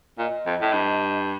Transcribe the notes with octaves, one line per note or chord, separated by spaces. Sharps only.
A#2 D#5
F2
A2
G2